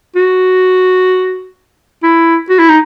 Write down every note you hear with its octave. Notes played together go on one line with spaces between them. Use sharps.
F#4
E4
F#4
E4
D#4